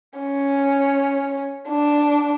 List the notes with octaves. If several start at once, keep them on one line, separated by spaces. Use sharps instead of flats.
C#4
D4